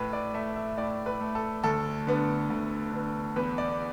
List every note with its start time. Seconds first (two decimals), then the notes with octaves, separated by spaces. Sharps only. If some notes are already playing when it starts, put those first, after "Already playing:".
Already playing: A2 B4
0.13 D5
0.34 A3 E5
0.56 E5
0.77 A2 D5
1.06 B4
1.21 A3
1.35 A4
1.64 D2 A4
2.07 D3 B3
2.50 D2
2.93 D3 B3
3.36 E2 B4
3.58 D5